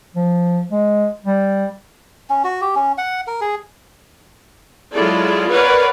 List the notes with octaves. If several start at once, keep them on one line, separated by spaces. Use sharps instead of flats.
F3
G#3
G3
C#4
F#4
G4
C#4
F#5
A#4
G#4
F#3 G#3 E4 F4 A4 D5
A#4 B4 C#5 D5 F5 F#5